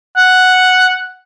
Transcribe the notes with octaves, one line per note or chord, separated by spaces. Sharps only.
F#5